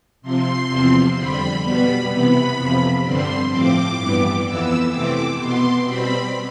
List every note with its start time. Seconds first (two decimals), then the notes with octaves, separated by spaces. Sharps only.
0.22 C3 F3 C4 C6
0.68 E2 C3 F3 C4
1.15 F2 D3 G3 B5
1.62 B2 G3 B3 B5
2.09 C3 E3 B3 B5
2.56 F2 C3 F3
3.03 G2 D3 G3 C4 C6
3.50 A2 F3 C4 D6
3.97 G2 E3 G3 B3
4.44 F2 E3 B3 E6
4.91 C3 E3 A3 C4 D6
5.37 B2 B3 C6
5.84 B2 G3 C4 B5